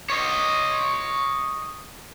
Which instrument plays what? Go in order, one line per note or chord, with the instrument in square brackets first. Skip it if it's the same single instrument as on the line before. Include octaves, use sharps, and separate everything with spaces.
[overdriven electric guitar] C#5 D#5